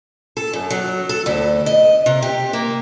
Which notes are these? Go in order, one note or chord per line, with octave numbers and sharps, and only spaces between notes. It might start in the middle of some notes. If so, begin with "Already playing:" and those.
A4
F#2
F#3
A4
D2
D#5
C3
G4
A#3